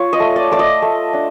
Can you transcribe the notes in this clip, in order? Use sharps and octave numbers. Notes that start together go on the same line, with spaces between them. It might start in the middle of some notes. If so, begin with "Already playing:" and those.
Already playing: F4 C#5
D#5
A3
D5
A3 D5
D#5
A3
D4